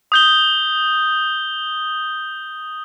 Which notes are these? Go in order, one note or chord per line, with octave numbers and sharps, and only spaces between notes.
D#6 G6 G7